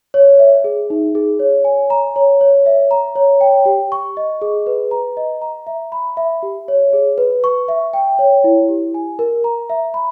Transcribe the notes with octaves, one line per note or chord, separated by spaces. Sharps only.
C#5
E5
G#4
D#4
G#4
C#5
G#5
A#5
C#5
C#5
E5
A#5
C#5
G5
G4
C#6
D#5
G#4
B4
A#5
D#5
A#5
E5
B5
E5
G4
C#5
G#4
B4
C#6
E5
G5
C#5
E4
G4
G#5
A#4
A#5
E5
B5